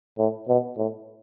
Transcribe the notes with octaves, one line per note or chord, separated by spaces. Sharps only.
A2
B2
A2